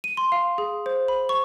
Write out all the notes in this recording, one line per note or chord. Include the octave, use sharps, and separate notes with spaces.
D#7
C6
F5
G#4
C5
B5
C#6